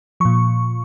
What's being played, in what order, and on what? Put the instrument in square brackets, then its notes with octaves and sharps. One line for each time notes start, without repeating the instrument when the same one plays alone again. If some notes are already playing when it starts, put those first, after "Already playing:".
[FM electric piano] A#2 F3 C#6